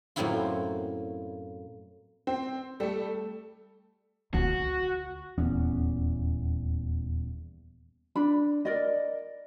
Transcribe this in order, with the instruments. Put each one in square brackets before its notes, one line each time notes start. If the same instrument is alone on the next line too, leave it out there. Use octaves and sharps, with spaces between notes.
[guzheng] F#2 A2 A#3 C4 E4 F4
[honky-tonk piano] C4
[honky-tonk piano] G3 A3 [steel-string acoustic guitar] A4
[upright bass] D2 [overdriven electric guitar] F#4
[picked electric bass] D#1 E2 B3 C#4
[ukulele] D4 B5
A#4 D5 D#5